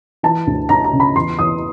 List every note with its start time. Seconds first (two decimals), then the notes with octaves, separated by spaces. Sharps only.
0.23 E3 A5
0.47 D2
0.69 D2 A#5
0.84 A#5
0.93 C#3
1.00 B5
1.15 E2 C6
1.39 E2 D#6